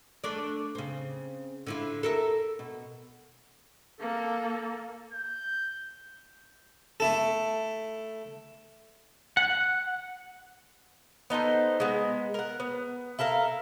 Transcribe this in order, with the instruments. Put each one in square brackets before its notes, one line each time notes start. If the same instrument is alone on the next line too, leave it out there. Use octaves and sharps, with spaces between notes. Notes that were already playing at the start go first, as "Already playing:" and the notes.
[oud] A3 D4 D5
C#3 C4
D3 E4 F4
A4 A#4 E5
B2
[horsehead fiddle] A#3 A4
[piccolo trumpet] G6
[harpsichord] A3 E4 A4
[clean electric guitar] F#5
[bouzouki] B3 D#4 A4 C5
G#3 B3
A#4 F#5
B3
E4 A4 A#4 F5